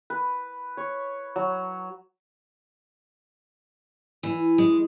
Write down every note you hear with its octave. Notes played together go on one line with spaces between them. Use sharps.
B4
C#5
F#3
E3
G#3